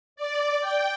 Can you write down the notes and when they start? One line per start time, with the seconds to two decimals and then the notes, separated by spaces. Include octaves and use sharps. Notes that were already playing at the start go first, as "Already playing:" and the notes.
0.16 D5
0.60 G5